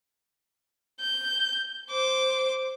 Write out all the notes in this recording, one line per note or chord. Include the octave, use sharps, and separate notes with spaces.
G6
C5 D6